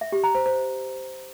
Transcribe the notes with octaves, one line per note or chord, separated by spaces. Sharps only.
E5
G4
A#5
C5
C5